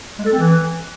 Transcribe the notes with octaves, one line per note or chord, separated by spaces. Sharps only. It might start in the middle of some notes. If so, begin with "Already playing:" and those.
G#3
A4
C4
E3